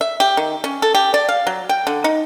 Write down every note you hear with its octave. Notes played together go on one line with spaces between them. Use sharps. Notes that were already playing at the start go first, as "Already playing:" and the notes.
E5
G4
D#3
C#4
A4
G4
D5
F5
F#3
G5
D3
D#4